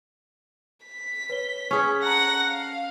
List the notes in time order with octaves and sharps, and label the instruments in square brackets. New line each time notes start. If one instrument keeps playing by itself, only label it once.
[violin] B6
[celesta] B4 C#5 G7
[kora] C#4 G#4
[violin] F#5 A#6 [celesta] A5 A#5
[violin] F5